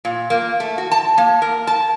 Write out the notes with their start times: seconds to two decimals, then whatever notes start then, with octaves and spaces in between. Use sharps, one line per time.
0.05 A#2
0.30 A#3
0.60 A3
0.78 F#4
0.91 A5
1.18 A#3
1.42 A#4
1.67 A5